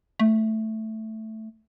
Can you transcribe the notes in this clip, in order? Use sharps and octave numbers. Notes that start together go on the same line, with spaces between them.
A3